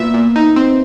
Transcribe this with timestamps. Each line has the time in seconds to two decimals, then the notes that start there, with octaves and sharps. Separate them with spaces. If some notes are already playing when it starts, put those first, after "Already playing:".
Already playing: A#2 B3 E5
0.14 A#2
0.36 D#4
0.56 C4